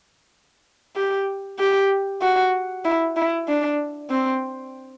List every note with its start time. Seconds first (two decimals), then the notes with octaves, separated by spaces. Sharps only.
0.96 G4
1.59 G4
2.22 F#4
2.85 E4
3.16 E4
3.48 D4
4.10 C4